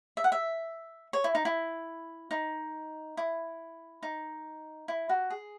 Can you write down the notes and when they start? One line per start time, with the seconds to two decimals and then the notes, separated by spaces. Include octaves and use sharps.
0.17 E5
0.24 F#5
0.32 E5
1.13 C#5
1.24 E4
1.35 D#4
1.45 E4
2.31 D#4
3.17 E4
4.03 D#4
4.88 E4
5.09 F#4
5.30 G#4